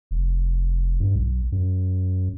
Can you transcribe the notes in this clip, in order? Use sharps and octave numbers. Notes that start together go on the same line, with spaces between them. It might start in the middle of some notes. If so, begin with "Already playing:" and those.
F1
G2
B1
F#2